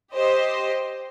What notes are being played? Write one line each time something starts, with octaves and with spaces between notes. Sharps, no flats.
G4 C5 D#5